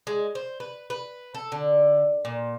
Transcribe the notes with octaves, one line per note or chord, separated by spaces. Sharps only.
G#3
C5
B4
B4
A4
D3
A#2